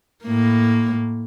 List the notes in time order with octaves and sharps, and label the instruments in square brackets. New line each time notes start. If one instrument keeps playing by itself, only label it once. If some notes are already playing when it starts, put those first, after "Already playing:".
[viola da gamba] A2 A#3